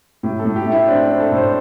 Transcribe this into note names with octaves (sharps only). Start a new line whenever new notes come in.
A2 G4
A4
A2
G4
A3
E4
C4 D4
E4
C4
A4
A2
C5